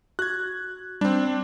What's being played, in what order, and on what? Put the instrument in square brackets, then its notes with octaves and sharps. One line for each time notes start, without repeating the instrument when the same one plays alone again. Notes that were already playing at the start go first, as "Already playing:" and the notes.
[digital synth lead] F#4 [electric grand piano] F#6 G#6
[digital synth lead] G3 [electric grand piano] C4 D4